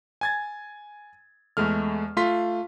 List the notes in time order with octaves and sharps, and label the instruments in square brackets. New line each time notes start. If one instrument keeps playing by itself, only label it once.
[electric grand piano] G#5 G#6 A6
E2 G#3 A3 F6
A3 F4 C6 B6